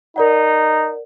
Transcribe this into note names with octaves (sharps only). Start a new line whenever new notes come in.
D#4 A#4 D5 F#5